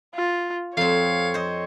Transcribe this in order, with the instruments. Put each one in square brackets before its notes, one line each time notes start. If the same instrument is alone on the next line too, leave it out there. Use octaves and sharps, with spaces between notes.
[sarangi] F4
[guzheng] F2 C4 [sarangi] C#5 [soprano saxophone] F5
[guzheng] C5 D#5